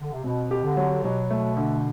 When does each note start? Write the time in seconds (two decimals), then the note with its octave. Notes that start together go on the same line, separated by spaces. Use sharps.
0.01 D3
0.12 C3
0.24 B2 C4
0.51 G4
0.64 D3
0.77 F#3
1.04 B2 F#3
1.30 A3
1.57 D3